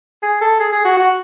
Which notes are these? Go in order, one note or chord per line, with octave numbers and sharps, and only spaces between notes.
G#4
A4
G#4
G#4
F#4
F#4